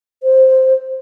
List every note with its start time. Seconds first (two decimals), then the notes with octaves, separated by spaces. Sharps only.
0.23 C5